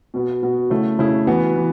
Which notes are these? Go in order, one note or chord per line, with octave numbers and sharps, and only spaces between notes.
B2 B3 F#4
B2 B3 F#4
C#3 A3 E4
C#3 A3 E4
E3 B3 F#4
E3